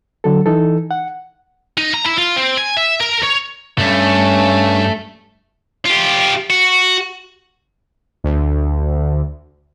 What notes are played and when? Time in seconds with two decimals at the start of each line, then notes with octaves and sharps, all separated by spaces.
0.24 D3 F#3 A4
0.46 E3 D#4 A4
0.91 F#5
1.78 D#4
1.94 A#5
2.05 E4
2.17 F4
2.36 C4
2.57 G#5
2.77 E5
3.01 A#4
3.24 C#5
3.78 G2 A3 C#4
5.86 F4 G4
6.50 F#4
8.24 D2